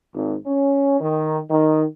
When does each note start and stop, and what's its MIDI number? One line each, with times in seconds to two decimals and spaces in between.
0.14 0.36 32
0.46 1.00 61
1.00 1.39 51
1.50 1.84 51